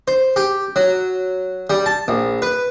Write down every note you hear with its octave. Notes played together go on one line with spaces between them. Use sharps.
C5
G4
F#3
G3
A5
A#1
B4